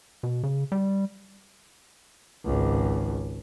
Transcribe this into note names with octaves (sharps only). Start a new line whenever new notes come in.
B2
C#3
G3
G#1 C#2